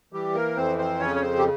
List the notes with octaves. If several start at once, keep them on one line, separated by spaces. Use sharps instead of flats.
E3 G3 G4
A#3 A#4
F2 C4 C5
C4 C5
C#3 C#4 C#5
C#5
C4 C5
G4